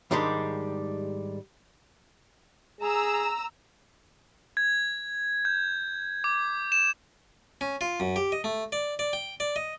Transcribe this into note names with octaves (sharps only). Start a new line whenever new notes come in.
G#2 D#3 G3 G#3 D4 G4
G#4 A#5 E6
G#6
G6
D6
E7
C#4
F4
F#2
G4
D#5
A3
D5
D5
G5
D5
D#5